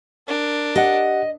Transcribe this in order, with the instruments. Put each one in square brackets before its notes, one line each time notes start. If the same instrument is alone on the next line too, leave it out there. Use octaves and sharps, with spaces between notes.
[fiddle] D4 A#4
[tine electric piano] G4 F#5 [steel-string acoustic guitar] D#5